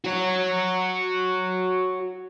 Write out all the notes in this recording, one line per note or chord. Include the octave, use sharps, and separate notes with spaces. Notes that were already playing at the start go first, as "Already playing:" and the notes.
F#4 C#5